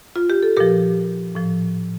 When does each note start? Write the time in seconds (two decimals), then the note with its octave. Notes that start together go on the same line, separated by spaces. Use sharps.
0.16 F4
0.30 G4
0.43 A4
0.57 A#2 F3 G4 A#4
1.35 A2 F3